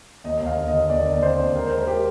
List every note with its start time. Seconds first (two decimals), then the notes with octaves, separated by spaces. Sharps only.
0.24 D#2 D#5
0.41 D#2
0.46 F5
0.57 D3
0.68 D#5
0.73 D#2
0.90 D#2 D5
1.06 D3
1.14 D5
1.22 C4 C5
1.39 D#2
1.55 G#3 A#4
1.66 G#3 C5
1.77 A#4
1.87 G4